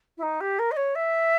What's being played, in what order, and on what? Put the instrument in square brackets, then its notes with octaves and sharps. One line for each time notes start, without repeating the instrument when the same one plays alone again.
[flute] E4
D#4
G4
A#4
D#5
C#5
E5